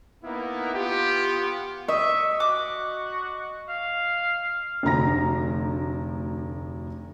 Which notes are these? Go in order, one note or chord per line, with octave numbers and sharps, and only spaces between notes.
A#3 B3 D#4 E4
B3 F4 G4
D#5 E5 C#6
F#4 D6 F#6
F5
F1 D2 A#5 A#6